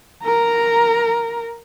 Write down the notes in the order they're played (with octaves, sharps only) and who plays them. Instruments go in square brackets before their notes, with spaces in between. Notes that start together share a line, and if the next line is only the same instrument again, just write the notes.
[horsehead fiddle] A#4 A#5